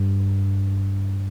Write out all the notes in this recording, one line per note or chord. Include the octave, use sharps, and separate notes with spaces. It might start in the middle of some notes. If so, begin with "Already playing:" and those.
Already playing: G2